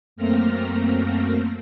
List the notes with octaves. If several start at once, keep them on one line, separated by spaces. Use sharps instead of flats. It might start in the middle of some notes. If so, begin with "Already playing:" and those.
F#2 A3 A#3 C4 F6 A#6